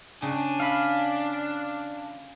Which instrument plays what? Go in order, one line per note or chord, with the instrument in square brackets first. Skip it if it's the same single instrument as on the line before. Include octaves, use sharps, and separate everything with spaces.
[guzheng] C#3 [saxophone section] D4 [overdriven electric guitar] G5 G#5
[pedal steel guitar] F5 B5